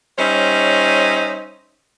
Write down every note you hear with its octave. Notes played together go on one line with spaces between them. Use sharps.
G3 C#4 D#4 C5 C#5 E5